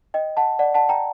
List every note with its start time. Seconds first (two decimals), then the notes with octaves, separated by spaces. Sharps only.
0.14 D#5 G5
0.37 F#5 A5
0.59 D5 F#5
0.74 F#5 A5
0.89 G5 A#5